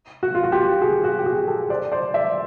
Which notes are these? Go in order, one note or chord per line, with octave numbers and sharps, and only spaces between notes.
F#4
F4
F#4
F4 G4
F#4 G#4
F#4
G4
F#4 G#4
G4 A4
C5 D5
C5 D5
D5 E5